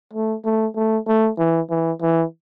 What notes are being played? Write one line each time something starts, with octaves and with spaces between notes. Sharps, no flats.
A3
A3
A3
A3
E3
E3
E3